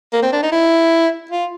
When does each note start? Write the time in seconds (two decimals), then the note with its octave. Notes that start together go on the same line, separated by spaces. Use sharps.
0.13 A#3
0.23 C4
0.33 D4
0.43 D#4
0.52 E4
1.31 F4